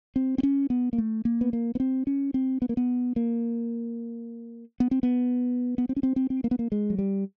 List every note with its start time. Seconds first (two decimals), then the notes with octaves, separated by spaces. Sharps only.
0.16 C4
0.38 C4
0.43 C#4
0.70 B3
0.93 A#3
0.98 A3
1.25 A#3
1.41 B3
1.53 A#3
1.75 B3
1.80 C4
2.07 C#4
2.34 C4
2.62 B3
2.69 A#3
2.77 B3
3.16 A#3
4.80 B3
4.91 C4
5.03 B3
5.78 B3
5.89 C4
5.96 C#4
6.03 C4
6.16 C4
6.30 C4
6.44 A#3
6.51 B3
6.59 A#3
6.72 G#3
6.90 F#3
6.98 G3